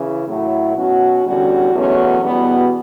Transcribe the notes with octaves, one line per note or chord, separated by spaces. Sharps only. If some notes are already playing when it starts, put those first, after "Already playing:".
Already playing: C#3 E3
A2 F#3 A3 E4
B2 F#3 C#4 F#4
E2 D3 G3 C#4 F#4
E2 B2 F#3 A3 C#4
E2 B2 G3 B3 F#4